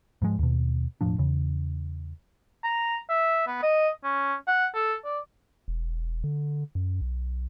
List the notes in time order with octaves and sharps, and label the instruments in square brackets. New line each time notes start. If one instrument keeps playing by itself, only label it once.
[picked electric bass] G#2 F3 G#3
D#2 B2
E1 A2 F3 D4
E2 C#3
[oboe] A#5
E5
B3
D#5
C#4
F#5
A4
D5
[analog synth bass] E1
D3
F#2
B1